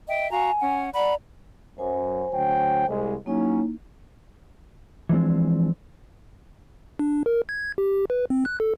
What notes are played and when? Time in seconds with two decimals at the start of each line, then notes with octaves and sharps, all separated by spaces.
0.07 D#5 E5 G5
0.31 F#4 F5 G#5 A#5
0.60 C#4 F#5
0.94 D5 F#5 A#5 B5
1.78 F#2 C5 G#5
2.32 D2 F#3 G5
2.87 C2 G#3
3.26 F#3 A#3 C#4 D#4 E4
5.09 E3 F3 G#3 C4 D4
6.99 D4
7.26 A#4
7.49 G#6
7.78 G4
8.10 B4
8.30 C4
8.45 F#6
8.60 A4